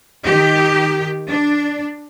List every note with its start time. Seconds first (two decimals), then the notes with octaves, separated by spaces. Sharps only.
0.24 D#3 G4
1.28 D4